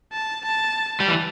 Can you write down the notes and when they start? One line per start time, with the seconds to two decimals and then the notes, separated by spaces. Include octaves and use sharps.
0.13 A5
0.45 A5
1.00 G3
1.08 E3